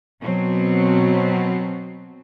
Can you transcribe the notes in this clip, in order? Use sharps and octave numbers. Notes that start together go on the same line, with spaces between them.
B2 F#3 C4